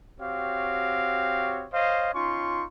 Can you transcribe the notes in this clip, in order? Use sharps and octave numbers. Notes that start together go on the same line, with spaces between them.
C4 F#4 G4 C#5 F5
C5 C#5 D#5 F5
C#4 D#4 F4 C6 C#6